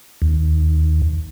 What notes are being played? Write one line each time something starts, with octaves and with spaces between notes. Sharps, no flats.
D#2